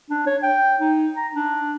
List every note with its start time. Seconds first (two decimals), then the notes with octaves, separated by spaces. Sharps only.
0.10 D4
0.27 C#5
0.43 G5
0.80 D#4
1.16 A#5
1.35 D4